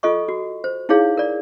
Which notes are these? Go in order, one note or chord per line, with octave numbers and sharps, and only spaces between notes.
F4 A4 D#5 C#6
F#4
C5
D#4 E4 G#4 C#5 F5
A#4 D5